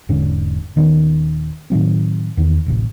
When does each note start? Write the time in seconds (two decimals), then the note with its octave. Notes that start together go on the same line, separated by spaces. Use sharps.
0.09 E1 G#2 D3 C#4
0.76 D#1 D#3 B3 C#4
1.70 A2 D#3 F#3 C4
2.37 E2 D#3
2.66 D1 A1 C3